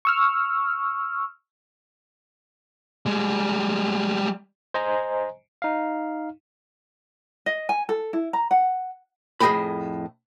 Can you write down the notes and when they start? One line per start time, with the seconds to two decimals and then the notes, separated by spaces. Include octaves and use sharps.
0.05 C#6 E6 F6
3.06 G3 G#3
4.74 C5 D#5 G#5 A#5
5.62 D#4 F5
7.46 D#5
7.69 G#5
7.89 A4
8.13 E4
8.33 A#5
8.51 F#5
9.40 F2 A2 G#4 D#5 G5 B5